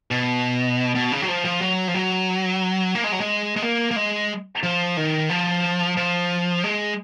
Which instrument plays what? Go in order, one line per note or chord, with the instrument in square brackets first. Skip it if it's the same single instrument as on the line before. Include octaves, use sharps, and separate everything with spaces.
[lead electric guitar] B2
B2
C#3
F#3
F3
F3
F#3
F3
F#3
A#3
G#3
F#3
G#3
G#3
A#3
A#3
G#3
F3
D#3
F3
F3
G#3